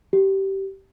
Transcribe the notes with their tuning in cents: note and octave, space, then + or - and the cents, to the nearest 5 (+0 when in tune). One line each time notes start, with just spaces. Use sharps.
G4 -20